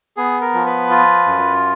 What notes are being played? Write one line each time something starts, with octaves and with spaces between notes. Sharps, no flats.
B3 G#4
A#4
F3
B4
F4
F#2